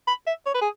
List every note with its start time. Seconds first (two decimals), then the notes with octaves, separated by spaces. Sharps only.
0.08 B5
0.27 E5
0.46 C#5
0.55 B4
0.61 G#4